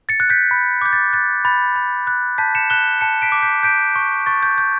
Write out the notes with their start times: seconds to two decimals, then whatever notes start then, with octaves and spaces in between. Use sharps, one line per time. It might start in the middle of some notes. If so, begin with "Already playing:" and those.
0.09 A6 C#7
0.20 F#6
0.30 G6 B6
0.51 B5
0.81 D6 G6
0.93 A6
1.13 F#6 A6
1.45 B5 A6
1.76 B5
2.07 F#6
2.38 A5 G6 B6
2.55 C#7 E7
2.70 F#6 E7 G7
3.01 A5 C#7 E7
3.22 B6 D7
3.32 D6
3.42 G6 B6
3.63 G6 B6 D7
3.95 C#6
4.26 C#6 A6
4.43 G6
4.58 G6